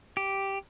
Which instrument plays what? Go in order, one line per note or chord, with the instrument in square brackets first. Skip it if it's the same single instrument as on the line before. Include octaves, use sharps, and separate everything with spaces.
[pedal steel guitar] G4